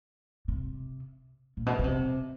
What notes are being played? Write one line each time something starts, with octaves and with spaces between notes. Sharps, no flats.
C3
A#2
B2
C#3
C3